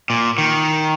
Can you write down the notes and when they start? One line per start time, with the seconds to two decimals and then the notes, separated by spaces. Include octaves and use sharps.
0.10 A#2
0.38 D#3